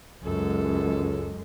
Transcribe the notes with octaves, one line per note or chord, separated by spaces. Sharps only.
C#2 F#2 G#3 A4